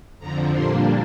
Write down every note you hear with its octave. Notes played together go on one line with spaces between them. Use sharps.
F2 D3 F3 A#5
A#2 G3 A#3 D4 C6